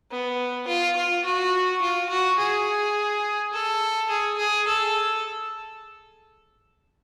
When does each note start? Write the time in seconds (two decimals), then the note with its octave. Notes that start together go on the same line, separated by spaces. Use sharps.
0.11 B3
0.67 F4
0.96 F4
1.25 F#4
1.82 F4
2.10 F#4
2.38 G#4
3.53 A4
4.10 G#4
4.38 G#4
4.67 A4